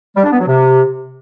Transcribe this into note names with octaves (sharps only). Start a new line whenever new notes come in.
G3
D4
B3
F#3
C3